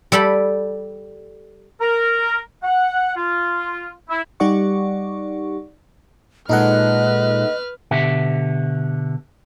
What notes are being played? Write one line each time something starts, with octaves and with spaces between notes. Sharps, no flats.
G3 A4 G5 B5
A#4
F#5
F4
E4
G3 D#4 G4 D5 F#5 C#6
A#2 G#3 D#4 A4 B4 D#5 F#5 F6
B2 D3 G4 E5